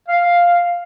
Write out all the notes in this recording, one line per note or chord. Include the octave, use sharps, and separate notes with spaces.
F5